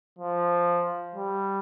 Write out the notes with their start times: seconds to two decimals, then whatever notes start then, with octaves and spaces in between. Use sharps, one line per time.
0.19 F3
1.15 G3